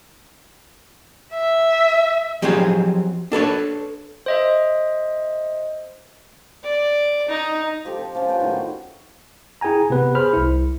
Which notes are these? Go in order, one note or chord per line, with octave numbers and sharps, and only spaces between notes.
E5
F3 F#3 C4 G4 G#4 C5
D4 A4 B4 C#5
C5 D#5 E5
D5
D#4
F3 G4 A4 C5
C4
F3 C#4 F4
B3 F4 C#5 G5
A2 D#3 F#3
E4 G#4 G5 G#5 A#5
C3 B3 B4
G#4 C5 B5 F6
C2 E4